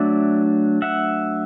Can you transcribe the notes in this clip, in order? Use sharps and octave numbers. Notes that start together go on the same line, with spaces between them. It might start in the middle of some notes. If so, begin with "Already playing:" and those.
Already playing: F#3 A3 D4 D5 E5
E5 F#5